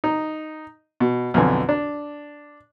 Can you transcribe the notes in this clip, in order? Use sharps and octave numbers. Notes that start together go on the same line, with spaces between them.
D#4
B2
B1 F2 D3 G#5
D4